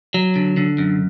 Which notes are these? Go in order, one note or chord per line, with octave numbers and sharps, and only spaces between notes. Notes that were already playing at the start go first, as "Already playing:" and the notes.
F#3
D3
D3
F#2